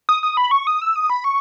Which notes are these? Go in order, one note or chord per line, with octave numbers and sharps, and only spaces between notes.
D#6
D#6
B5
C#6
D#6
E6
D#6
B5
C#6